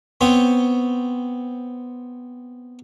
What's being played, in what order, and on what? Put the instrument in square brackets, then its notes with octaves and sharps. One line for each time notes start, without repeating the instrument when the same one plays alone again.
[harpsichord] B3 C4 C5 C#5